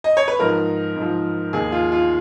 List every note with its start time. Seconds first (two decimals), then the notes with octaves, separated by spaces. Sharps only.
0.04 D#5
0.17 C#5
0.28 B4
0.39 G#2 F3 A#4
0.97 G#2 F3
1.53 D#2 D#3 G#4
1.72 F4
1.92 F4